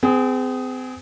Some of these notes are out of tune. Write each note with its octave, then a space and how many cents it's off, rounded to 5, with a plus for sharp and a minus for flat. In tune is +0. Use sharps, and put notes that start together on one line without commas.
C4 -40 G#4 +0